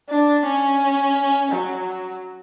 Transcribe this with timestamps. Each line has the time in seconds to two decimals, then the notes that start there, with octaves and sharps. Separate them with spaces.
0.10 D4
0.45 C#4
1.52 F#3